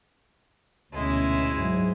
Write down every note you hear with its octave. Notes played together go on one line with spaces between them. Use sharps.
D2 B2 G#3 C#4 E4
G#2 F#3